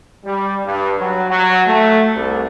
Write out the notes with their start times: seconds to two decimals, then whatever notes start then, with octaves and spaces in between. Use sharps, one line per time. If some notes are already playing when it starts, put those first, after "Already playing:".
0.25 G3
0.66 G2
0.99 F#3
1.30 F#3
1.67 A3
2.15 C2